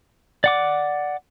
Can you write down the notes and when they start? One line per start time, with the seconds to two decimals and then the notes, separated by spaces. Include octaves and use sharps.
0.44 D5 F#5 D6